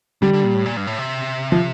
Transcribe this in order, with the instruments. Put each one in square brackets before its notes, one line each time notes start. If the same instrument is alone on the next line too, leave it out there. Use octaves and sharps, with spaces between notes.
[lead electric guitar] D3 [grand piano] G3
[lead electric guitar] D3
A#2
A2
A#2
G2
A2
C3
[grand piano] F3